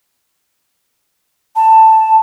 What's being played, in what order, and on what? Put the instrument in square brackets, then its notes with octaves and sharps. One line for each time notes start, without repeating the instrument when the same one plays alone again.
[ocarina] A5